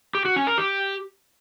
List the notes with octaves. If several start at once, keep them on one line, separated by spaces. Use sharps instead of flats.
G4
F#4
C#4
A#4
G4